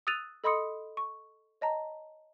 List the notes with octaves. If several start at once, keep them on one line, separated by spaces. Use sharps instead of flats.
D#6 E6 F#6 A6 D#7 F7
A4 D#5 B5 C6 D#6 C#7
C#6
C#5 D#5 A5 A#5